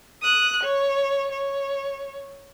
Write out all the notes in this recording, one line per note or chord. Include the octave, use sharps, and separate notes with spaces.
D#6 F#6
C#5
C#5